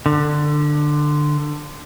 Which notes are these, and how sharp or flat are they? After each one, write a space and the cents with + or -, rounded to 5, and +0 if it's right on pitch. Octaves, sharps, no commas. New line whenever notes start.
D3 +15